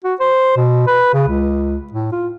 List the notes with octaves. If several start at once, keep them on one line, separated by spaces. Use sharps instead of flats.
F#4
C5
B2
B4
C#3
C#2
A2
F4